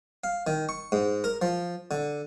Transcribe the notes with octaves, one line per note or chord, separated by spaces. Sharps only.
F5
D#3
C#6
G#2
A#4
F3
D3